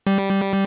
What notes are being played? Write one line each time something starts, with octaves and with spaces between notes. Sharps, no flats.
G3